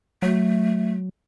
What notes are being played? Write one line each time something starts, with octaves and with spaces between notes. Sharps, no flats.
F#3 A3